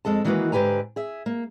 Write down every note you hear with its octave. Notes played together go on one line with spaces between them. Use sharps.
F2 G#3 A4 A5
D#3 E3 G#3 A#3 F#4 B4
G#2 D3 G4 B4 G#5 A#5
G#4 E5
A#3